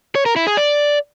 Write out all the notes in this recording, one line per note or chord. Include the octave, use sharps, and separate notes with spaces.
C#5
A#4
E4
G#4
D5